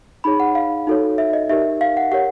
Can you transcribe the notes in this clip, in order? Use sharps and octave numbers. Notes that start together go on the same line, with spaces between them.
D#4 G#4 C#5 B5
F#5
F5
D#4 F#4 A4 C#5
E5
D#5
D#4 G4 A#4 D5 E5
F5
F#5
G4 A#4 C#5 F#5